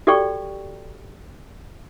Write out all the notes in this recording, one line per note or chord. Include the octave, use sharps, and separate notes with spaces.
F#4 G4 A4 D5 G5 C#6